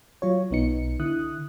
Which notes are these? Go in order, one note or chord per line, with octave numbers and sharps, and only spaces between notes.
F#3 F4 C#5
B1 B3 D#4 C#7
D3 E4 D#6 F#6